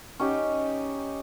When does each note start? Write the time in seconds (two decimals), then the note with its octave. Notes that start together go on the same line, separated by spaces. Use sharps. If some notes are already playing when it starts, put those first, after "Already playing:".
0.20 C#4 D#4 G4